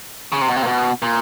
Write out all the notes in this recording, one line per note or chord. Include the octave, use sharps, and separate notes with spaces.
C#3
C3
B2
C3
A#2
B2
A#2